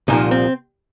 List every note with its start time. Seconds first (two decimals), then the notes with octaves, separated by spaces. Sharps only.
0.08 C2 A#2 F3 D#4
0.31 C4